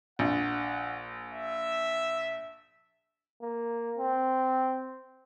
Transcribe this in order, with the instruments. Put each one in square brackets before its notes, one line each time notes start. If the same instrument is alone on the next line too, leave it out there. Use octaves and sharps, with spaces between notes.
[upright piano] A#1 [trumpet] F#5
[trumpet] E5
[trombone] A#3
C4